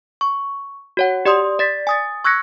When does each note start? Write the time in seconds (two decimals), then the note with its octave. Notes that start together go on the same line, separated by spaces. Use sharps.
0.21 C#6
0.97 F#4 C#5 F#5
1.25 G4 D5 C6 D#6
1.59 D5 A6 B6
1.87 G#5 D#6 A6
2.24 C#6 E6 F#6 G#6 A#6 C#7